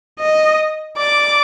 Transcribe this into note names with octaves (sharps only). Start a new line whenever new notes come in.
D#5
D5 D6